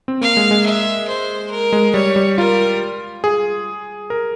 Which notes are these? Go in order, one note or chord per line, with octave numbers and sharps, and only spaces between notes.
C4
A#3 F5
G#3
G#3
E5
C5
A#4
G#3
G3 C#5
G3
F4 A#4
G#4
A#4